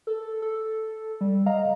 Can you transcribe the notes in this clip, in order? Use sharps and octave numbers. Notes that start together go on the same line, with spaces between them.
A4
A4
G3
D#5 F5 A#5